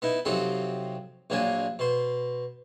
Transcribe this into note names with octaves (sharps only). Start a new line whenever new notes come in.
B3 D#4 E4
C3 F3 F#3 C4 D#4 A4
A#1 A#2 F#3 A#3 D4 G#5
B2 C5